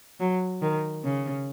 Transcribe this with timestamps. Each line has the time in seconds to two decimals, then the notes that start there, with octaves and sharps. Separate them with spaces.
0.20 F#3
0.62 D#3
1.05 C#3